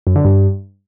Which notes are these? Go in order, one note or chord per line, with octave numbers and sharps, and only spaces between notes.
F#2
D3
G2